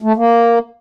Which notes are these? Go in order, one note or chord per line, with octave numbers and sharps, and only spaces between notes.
A3
A#3